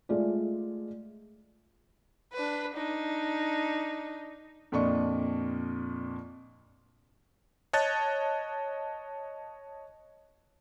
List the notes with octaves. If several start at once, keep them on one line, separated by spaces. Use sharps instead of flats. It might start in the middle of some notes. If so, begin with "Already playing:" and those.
G#3 A3 F4 G#4 D5
D4 B4
D4 D#4
F2 A#2 D4 D#5 C#6
C#5 D#5 A5 F#6 A6